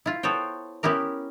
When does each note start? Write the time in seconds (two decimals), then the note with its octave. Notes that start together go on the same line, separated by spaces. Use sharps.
0.06 E4 F4
0.23 B3 A4 C5 C#5 G5
0.83 B3 C#4 E4 G4 A#4